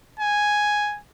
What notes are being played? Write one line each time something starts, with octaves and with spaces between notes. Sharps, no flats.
G#5